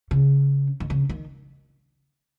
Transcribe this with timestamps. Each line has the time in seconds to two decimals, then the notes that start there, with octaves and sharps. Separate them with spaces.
0.11 C#3
0.80 D#3
0.90 C#3
1.09 D#3